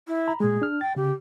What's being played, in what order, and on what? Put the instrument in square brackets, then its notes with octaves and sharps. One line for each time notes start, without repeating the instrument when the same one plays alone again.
[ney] E4
[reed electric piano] A#5 B5
[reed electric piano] A#2 G#3 [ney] G#4
[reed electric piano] D4 F6
[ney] G5 [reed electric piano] A6
[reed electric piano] C#3 [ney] G4